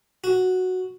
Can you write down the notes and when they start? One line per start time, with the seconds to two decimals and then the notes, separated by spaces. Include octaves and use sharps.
0.24 F#4